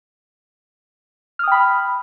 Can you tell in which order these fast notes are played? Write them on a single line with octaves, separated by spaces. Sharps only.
F6 D#6 G5 B5